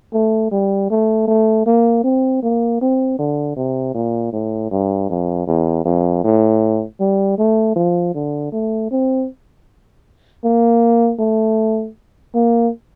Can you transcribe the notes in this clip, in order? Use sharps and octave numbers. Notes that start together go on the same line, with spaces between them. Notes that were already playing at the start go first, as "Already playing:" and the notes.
A3
G3
A3
A3
A#3
C4
A#3
C4
D3
C3
A#2
A2
G2
F2
E2
F2
A2
G3
A3
F3
D3
A3
C4
A#3
A3
A#3